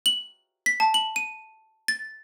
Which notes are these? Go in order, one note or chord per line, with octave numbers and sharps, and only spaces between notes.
F#7
B6
A5
F#7
D#7
A6